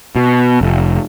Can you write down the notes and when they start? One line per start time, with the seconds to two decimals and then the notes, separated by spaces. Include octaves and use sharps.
0.16 B2
0.61 F1